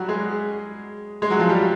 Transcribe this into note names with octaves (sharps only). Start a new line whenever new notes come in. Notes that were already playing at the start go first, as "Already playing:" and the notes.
Already playing: F#3 G3 F#4 G4
G#3 G#4
G#3 G#4
F#3 F#4
F3 F4
G3 G4